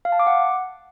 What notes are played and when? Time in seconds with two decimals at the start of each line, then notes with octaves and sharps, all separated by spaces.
0.05 F5
0.12 A5
0.19 D6
0.27 F#5